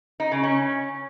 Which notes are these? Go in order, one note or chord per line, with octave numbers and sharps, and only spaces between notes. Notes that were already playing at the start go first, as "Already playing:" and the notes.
D#4
C#3
C#4